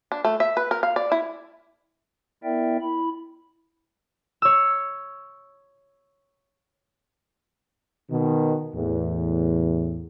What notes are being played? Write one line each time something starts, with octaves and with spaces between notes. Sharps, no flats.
D4
A3
E5
B4
A#4
F5
D5
E4
B3 E4 A#4 D5 E5 G5
E4 B5
C#5 E6
B2 D#3
E2 A2